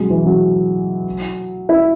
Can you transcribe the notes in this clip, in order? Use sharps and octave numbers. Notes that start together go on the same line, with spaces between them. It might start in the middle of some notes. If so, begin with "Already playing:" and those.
Already playing: F#3 G#3
E3
F#3
E4